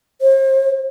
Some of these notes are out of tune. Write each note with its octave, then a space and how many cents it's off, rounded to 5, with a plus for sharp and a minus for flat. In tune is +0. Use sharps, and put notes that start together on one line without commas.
C5 +45